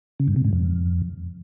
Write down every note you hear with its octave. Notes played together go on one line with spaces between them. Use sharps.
C#3
G2
C3
G#2
F2